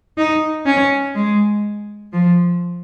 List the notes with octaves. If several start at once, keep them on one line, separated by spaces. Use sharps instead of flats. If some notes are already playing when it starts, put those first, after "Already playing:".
D#4
C#4
G#3
F3